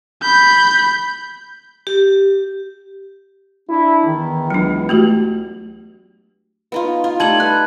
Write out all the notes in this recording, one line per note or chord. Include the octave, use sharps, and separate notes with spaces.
B5 G6
G4
D4 E4
E2 D#3
C#2 F#3 D4
A3 F#4 G4
B3 D#4 F4
F4
G3 A3 D#4 A5 G#6 F#7
B4 F#6